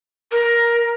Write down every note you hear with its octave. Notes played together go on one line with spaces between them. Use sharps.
A#4